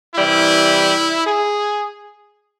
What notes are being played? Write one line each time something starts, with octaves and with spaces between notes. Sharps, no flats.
C3 E3 G3 E4
G#4